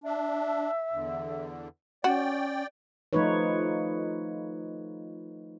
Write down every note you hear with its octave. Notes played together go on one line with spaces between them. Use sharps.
D4 E5
E2 D3
C#4 F#4 D5 G5
F3 A3 D#4 F4 B4 C#5